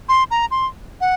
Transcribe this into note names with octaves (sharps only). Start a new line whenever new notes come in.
C6
A#5
C6
F#5